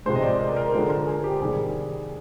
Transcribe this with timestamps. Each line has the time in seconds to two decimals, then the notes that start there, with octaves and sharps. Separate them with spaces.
0.06 C3 F3 G#3 C5
0.15 D#5
0.23 D5
0.39 A#4
0.56 A#4
0.74 D3 F3 G#3 C5
0.90 A#4
1.07 G#4
1.24 G4
1.41 C3 D#3 G3 G#4